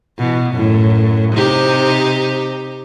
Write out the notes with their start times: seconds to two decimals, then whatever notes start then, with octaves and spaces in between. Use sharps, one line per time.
0.18 B2 E3
0.52 F#2 A2
1.33 C3 D#4 G4